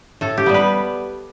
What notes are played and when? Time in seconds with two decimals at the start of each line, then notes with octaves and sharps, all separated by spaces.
0.21 A2 A4
0.38 G4
0.46 G3 B3
0.54 B4